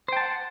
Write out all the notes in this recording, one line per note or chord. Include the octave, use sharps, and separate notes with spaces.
C5 F#5 G5 A5